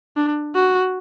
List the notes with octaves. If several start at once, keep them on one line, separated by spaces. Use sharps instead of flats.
D4
F#4